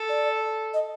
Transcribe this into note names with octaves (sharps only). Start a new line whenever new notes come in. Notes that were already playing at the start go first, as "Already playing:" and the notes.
Already playing: A4
D5
D#5